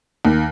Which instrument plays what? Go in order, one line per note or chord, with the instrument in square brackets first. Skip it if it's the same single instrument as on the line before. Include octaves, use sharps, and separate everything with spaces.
[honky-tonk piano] D#2